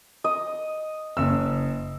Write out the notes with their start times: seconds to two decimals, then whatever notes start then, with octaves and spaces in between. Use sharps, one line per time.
0.24 D#5
1.17 F#1 E6